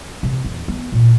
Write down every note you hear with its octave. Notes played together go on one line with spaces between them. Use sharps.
C3
E2
B3
A#2